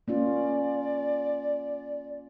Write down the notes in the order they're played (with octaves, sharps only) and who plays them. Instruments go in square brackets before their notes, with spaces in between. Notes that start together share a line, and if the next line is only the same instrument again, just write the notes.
[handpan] A#3 C#4 F4 [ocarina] D5